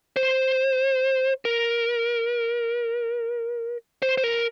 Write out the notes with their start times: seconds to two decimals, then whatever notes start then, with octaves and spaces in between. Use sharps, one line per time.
0.16 C5
1.45 A#4
4.02 C5
4.18 C5
4.24 A#4